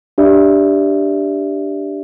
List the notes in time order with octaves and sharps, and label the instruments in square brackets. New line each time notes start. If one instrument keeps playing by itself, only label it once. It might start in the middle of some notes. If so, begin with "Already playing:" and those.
[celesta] D4 G4 D5 E5